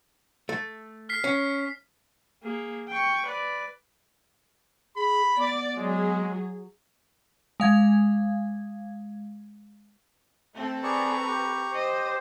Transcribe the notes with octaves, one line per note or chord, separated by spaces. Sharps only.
A3
F6 B6 C7
C#4
A#3 G#4
G5 C#6
B4 D5
G#4 B5
B3 D5
F#3 G#3 G#4
G#3 F5 G#6
A3 C4 A4
G#4 B4 D5 A#5 C#6
G4
C5 D#5